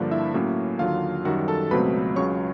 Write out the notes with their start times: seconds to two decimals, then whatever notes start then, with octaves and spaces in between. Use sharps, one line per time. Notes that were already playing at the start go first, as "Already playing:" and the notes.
Already playing: G2 D3 F3 A#3 D4
0.11 E4 E5
0.34 A2 F#3 A#3 C#4
0.79 D#2 D3 F#3 F4 F5
1.25 F#2 D#3 G3 F#4 F#5
1.48 A4 A5
1.71 C#2 B2 F#3 A3 C4 B4 B5
2.16 C#2 C#3 F#3 C#5 C#6